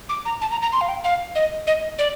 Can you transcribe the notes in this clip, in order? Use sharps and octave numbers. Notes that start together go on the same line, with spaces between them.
D6
A#5
A5
A#5
A#5
C6
F5
G5
F5
D#5
D#5
D5